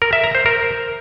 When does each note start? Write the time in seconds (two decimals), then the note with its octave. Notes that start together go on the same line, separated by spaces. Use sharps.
0.02 A#4
0.13 E5
0.24 A#5
0.35 C5
0.46 A#4